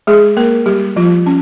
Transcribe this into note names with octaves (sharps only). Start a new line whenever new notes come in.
G#3 G#4
A#3 A#4
G3 G4
F3 F4
C#4